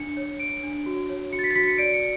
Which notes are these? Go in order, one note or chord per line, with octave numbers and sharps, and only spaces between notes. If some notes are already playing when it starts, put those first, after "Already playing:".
Already playing: D4 C#7
C#5
C#5 D7
D4
F#4
C#5
F#4 C#7
A6
B6
A6
F#4 B6
C#7
D5 D7
C#7